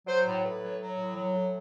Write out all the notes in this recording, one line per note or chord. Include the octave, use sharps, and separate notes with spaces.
F#3 C5
A2
A2 B4
F#3
F#3
A2
F#3
A2